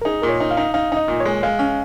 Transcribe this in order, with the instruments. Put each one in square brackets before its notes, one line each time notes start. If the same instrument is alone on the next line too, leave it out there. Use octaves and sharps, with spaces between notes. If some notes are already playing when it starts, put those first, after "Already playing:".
[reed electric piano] A#4
[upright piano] D#4 [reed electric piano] G#4
[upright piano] A#2 [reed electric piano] A#4
[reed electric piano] C#5
[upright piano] D#4
[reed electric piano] F5
[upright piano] D#4
[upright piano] D#4 [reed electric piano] F5
[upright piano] D#4 [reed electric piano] D#5
[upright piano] A#2
[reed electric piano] C#5
[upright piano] G#3
[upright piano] G#3 [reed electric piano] F5
[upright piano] C#4